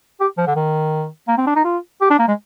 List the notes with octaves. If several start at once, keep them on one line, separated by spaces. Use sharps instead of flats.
G4
F3
D3
D#3
A#3
C4
D4
D#4
F4
G4
D4
A#3
G#3